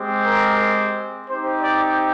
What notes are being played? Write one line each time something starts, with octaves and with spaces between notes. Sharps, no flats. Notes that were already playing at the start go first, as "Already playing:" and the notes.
Already playing: G#3 C4 G4
A#4
C4 D#4 G4 C5
D5